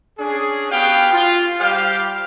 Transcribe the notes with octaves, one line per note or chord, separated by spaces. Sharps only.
C#4 D4 G#4
B3 F#4 G4 F5 G5
F4
G3 G4 C5 F5